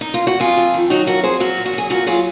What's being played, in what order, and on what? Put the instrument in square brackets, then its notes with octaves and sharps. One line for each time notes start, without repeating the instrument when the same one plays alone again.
[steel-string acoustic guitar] D#4
F4
F#4
F2 F4 G#4
F2
D#3
F#3 D#4 F#4
F2 F#4 A#4
F2 G#4 C5
F#3 F#4 A#4
A#2
F#4
F#3 G#4
A#2 F#4 A#4
F#3 F4 G#4